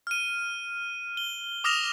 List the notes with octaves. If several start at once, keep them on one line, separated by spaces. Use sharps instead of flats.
F6 D#7
G7
D6 D#6 F6 A#6 E7 F7